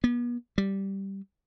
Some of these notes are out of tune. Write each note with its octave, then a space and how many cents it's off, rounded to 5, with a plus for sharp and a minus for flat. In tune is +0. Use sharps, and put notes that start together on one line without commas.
B3 -40
G3 -5